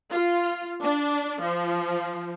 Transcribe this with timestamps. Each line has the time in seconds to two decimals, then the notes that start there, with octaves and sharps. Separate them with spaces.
0.11 F4
0.81 D4
1.40 F3